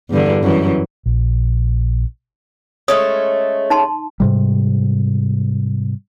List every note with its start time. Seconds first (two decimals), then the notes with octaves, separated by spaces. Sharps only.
0.10 E2 G2 D3
0.42 F#2 E3
1.06 A#1
2.88 G#3 A3 C#4 D#6
3.70 D#4 A5 C6
4.20 G#2 C3 G3